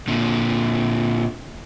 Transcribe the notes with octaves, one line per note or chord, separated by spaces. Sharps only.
A#2 D3